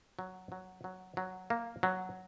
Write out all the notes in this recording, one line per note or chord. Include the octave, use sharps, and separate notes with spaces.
F#3
F#3
F#3
F#3
A#3
F#3